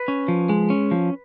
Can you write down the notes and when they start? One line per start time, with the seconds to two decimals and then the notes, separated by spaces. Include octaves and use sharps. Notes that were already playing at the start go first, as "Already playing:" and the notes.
Already playing: B4
0.08 C#4
0.28 F3
0.49 G#3
0.70 C#4
0.91 F3